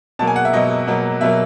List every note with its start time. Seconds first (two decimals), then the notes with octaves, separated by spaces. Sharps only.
0.19 B2 F#3 A#3 A5
0.27 G#5
0.36 F#5
0.45 E5
0.53 B2 F#3 A#3 D#5
0.87 B2 F#3 A#3
1.21 B2 F#3 A#3 E5